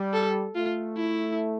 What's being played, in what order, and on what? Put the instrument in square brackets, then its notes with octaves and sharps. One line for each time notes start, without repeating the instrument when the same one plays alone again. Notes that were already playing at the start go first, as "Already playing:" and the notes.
Already playing: [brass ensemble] G3
[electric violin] A4
[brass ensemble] A3 [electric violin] F4
[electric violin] E4